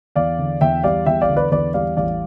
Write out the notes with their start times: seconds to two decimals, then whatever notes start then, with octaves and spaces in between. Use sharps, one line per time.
0.16 E2 D5 F5
0.38 D3
0.61 E2 E5 G5
0.83 G3 D5 F5
1.06 E2 E5 G5
1.21 D5 F5
1.29 D3
1.36 B4 D5
1.52 E2 B4 D5
1.74 G3 D5 F5
1.96 A1 D5 F5